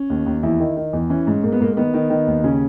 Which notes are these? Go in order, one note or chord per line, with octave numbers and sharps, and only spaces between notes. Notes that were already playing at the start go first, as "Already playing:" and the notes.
Already playing: C#4
D#2
D#2
E2 E4
D#3
D#3
E2
E3 C#4
G#2
G#2 A#3
B3
G#2 A#3
A#3
D#3 B3
D#3
D#3
D#2
C#3 C#4